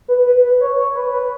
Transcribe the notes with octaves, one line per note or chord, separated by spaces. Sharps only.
B4
B4
B4
C#5
C#5
B4
B4